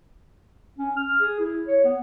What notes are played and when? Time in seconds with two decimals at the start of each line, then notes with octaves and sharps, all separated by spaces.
0.78 C#4
0.96 F6
1.20 G#4
1.39 E4
1.68 C#5
1.85 B3